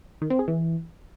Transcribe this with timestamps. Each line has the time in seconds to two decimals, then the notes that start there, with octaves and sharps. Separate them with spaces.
0.22 D#3
0.30 C4
0.39 G#4
0.48 E3